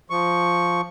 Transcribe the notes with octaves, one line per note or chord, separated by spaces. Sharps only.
F3 C#6